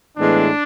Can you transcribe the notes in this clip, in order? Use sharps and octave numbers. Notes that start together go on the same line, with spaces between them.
A2 E3 G#3 B3 D4